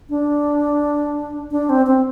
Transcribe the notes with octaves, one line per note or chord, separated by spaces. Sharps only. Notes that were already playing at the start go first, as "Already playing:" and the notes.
D4
D4
C4
C4